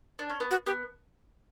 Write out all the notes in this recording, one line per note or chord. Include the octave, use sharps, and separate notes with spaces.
D4
C#4
B3
F#4
B3 G4